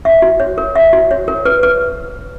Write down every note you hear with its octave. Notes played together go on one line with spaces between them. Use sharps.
E5
F#4
C#5
A#4
E5
F#4
C#5
A#4
B4
B4